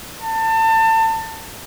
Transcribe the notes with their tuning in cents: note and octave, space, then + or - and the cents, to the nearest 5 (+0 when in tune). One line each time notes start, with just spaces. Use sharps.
A5 +30